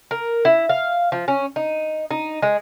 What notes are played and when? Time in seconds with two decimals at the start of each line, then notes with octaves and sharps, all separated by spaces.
0.11 A#4
0.45 E4
0.69 F5
1.12 F3
1.28 C#4
1.56 D#4
2.11 D#4
2.42 G#3